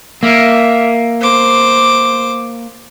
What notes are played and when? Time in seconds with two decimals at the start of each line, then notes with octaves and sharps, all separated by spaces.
0.23 A#3 E5
1.21 C5 D6